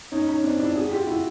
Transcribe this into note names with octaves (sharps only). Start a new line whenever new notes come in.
C#4 D#4
C#4 D#4
C4 D4
D4 E4
F#4 G#4
F4 G4
E4 F#4